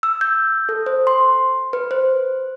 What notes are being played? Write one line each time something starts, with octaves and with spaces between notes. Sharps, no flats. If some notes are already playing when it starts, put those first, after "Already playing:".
E6
G6
A4
C5
C6
B4
C5